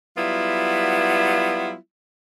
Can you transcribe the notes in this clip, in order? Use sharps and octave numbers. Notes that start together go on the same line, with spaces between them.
F#3 G3 B3 E4 F4